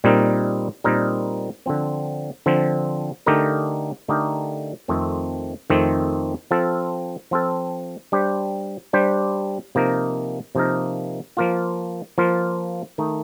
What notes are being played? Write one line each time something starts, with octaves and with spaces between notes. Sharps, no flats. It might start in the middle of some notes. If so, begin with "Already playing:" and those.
A#2 G3 C4 D#4 A#4
A#2 G3 C4 D#4 A#4
D3 F3 C4
D3 F3 C4
D3 A3 D#4 G4 A#4
D3 A3 D#4 G4 A#4
F2 D#3 A3 C4
F2 D#3 A3 C4
F3 C4 F4 A4
F3 C4 F4 A4
G3 D4 G4 C5
G3 D4 G4 C5
C3 F3 A#3 D#4 A#4
C3 F3 A#3 D#4 A#4
F3 A#3 F4
F3 A#3 F4
D#3 A3 D#4